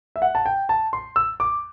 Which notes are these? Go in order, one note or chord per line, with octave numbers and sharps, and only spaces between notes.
E5
F#5
A5
G5
A5
C6
E6
D6